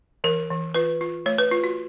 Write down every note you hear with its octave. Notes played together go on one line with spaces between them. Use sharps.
E3 A#4
E3
F4 B4
F4
A3 C#5
B4
F4
F#4